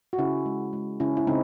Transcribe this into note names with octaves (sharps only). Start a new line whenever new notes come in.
F#4
C#3 C#4 E4
G#3
G#3
C#3 C#4 E4
E4
C#3 C4 D#4